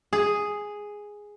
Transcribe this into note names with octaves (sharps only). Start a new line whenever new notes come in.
G#4